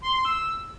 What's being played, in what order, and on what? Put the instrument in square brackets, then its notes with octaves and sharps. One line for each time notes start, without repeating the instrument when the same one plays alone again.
[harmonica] C6
C6
E6